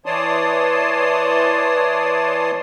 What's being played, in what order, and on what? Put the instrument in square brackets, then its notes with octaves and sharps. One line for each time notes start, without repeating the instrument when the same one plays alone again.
[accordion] E3 C#5 D5 A5 C6 D#6